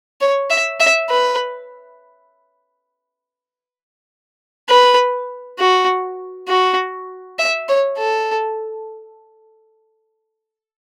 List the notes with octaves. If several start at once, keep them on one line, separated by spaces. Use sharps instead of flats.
C#5
E5
E5
B4
B4
F#4
F#4
E5
C#5
A4